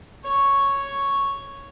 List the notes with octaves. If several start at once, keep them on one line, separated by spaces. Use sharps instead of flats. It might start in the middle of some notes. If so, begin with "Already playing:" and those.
C#5 C#6